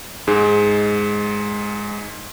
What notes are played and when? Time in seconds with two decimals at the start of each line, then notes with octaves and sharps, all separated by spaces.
0.27 G#2 G#3